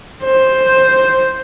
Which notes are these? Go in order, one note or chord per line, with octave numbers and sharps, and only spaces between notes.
C5